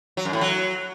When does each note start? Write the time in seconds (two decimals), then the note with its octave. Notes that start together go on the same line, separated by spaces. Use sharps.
0.17 F#3
0.25 F#2
0.33 A2
0.41 F#3